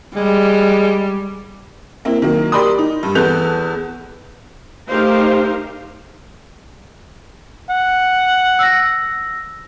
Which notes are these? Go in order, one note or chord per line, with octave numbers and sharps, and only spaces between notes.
G3 G#3
A#3 C4 E4
D#3 F#3 A#3
G4 A#4 D5 B5 C6 D#6
D#4
G2
E2 B3 A4 F#6 G6 F7
A3 D#4 G4 A#4 C5 F5
F#5
E6 A#6